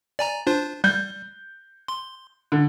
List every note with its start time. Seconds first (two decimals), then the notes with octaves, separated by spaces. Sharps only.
0.19 D5 G#5 A#5
0.47 D4 F4 C5
0.84 G3 G6
1.88 C6
2.52 D3